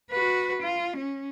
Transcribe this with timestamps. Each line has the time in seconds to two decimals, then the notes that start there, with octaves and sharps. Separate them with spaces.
0.11 F#4 B4
0.62 F4
0.97 C#4